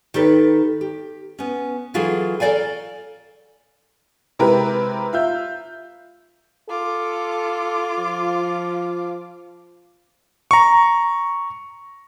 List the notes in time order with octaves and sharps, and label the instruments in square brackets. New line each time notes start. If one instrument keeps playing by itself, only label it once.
[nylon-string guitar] D#3 G4 A4 B4
G4
B3 C#4
E3 F#3 F4 G#4 A4
A4 A#4 C#5 D5 F5 G#5
[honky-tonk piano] C3 G#3 E4 G4 A#4 B4
F4 E5 G6
[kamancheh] F4 D6 [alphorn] A4
[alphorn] F3
[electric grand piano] A#5 C#6